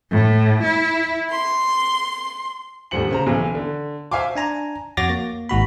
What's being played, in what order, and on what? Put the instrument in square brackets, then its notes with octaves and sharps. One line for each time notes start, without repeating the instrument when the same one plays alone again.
[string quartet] A2
E4
C6
[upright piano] D#1 D2 G3 C5 C#7 F#7
C#3 C5 A#5
B1 B2 E3
D3
C5 E5 F5 G#5 C6 D6
[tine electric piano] D4 G#5 A#5
F2 F#4 C#5 D6 A6 A#6
A#3
G#1 G#2 F#4 B5